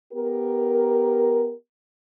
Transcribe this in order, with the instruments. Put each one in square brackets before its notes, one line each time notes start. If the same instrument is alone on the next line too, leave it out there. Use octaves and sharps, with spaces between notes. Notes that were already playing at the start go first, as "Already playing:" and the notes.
[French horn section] B3 G4 A#4